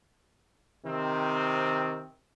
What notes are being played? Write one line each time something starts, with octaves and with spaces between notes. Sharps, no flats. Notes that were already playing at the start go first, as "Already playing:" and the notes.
C3 D#3 C4